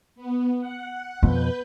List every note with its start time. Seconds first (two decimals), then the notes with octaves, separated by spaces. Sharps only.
0.16 B3
0.60 F#5
1.23 F2 B2 B3 B4 G6